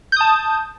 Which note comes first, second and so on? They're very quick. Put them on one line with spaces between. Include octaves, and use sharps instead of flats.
G6 D#6 A5